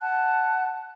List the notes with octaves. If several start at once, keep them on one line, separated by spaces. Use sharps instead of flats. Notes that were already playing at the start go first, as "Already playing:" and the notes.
F#5 A5 F#6